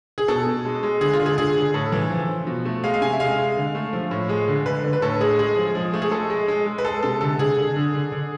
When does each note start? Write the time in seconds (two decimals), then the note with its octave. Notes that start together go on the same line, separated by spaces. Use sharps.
0.18 G#4
0.28 B2 A4
0.47 B2
0.65 G#3
0.83 G#3
1.01 D3 G#4
1.14 F4
1.20 D3
1.26 G#4
1.38 D3 G#4
1.56 D3
1.74 A2 A4
1.92 E3
2.10 F3
2.29 F3
2.47 B2
2.65 A3
2.84 G#3 F5
2.94 F5
3.01 C3 G#5
3.12 E5
3.20 G#3 F5
3.38 G#3
3.56 D3
3.75 A3
3.93 F3
4.11 A2
4.29 G#3
4.48 D3
4.66 D3 B4
4.84 D3
4.93 B4
5.02 A2 A4
5.20 G#3 G#4
5.39 G#3 G#4
5.57 F3
5.75 F3
5.94 A3
6.02 G#4
6.11 G#3 A4
6.30 G#3
6.48 G#3
6.66 G#3
6.78 B4
6.85 G#3 A4
7.03 C3 A4
7.21 D3 A4
7.39 D3 G#4
7.57 D3
7.76 D3
7.94 D3
8.12 D3